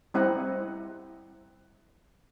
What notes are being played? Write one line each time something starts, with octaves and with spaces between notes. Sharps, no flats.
G3 C4 E4 D#5 F#5 A#5